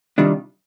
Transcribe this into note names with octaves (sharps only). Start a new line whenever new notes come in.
C3 D#3 G3 D4 F4